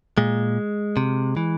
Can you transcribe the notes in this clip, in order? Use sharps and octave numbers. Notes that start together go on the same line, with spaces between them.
A#2 G#3
C3
E3